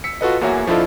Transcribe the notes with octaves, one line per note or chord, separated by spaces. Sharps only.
E6 B6 C#7
F4 F#4 A4 B4 D#5
E2 A#3 F#4 C#5 E5 G#5
F3 D4 E4 F4 A4 D#5